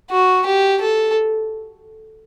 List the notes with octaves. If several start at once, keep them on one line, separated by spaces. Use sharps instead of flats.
F#4
G4
A4